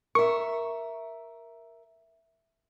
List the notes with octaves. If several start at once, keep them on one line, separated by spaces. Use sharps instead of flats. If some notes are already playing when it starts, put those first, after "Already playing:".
A#4 E5 C#6